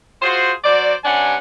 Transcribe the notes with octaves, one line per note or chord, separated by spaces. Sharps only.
F4 F#4 G#4 C5
F#3 F#4 C5 D5
G2 C3 C#4 D4 F#5 G#5